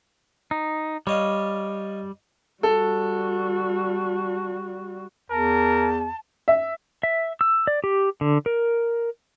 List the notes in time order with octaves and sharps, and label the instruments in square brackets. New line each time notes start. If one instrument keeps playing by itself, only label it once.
[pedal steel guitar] D#4
[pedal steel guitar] G3 [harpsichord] C#5 D#5 F5
[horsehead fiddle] G3 F#4 [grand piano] A4
[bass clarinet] E2 [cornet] A#4 [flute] A5
[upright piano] E5
[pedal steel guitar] E5
E6
D5
G4
D3
A#4